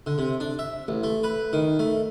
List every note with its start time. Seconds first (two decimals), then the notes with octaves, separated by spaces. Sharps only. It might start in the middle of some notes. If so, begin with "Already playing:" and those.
0.06 D3
0.18 C3
0.40 D4
0.59 E5
0.88 A1
1.04 A3
1.23 B4
1.53 D#3
1.79 A3